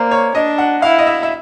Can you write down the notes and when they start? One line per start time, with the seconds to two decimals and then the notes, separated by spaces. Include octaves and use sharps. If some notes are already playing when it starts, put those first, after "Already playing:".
Already playing: A#3 C5 D5
0.11 C#5
0.35 D4 D#5
0.58 F#5
0.82 E4 F5
0.98 D#5
1.07 E5
1.23 E5